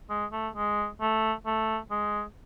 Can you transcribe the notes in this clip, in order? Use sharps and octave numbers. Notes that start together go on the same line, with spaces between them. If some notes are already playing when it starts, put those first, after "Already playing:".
G#3
A3
G#3
A3
A3
G#3